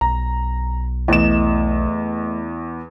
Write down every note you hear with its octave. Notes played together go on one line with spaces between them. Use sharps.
B1 A#5
E2 A3 E4 D#5 E7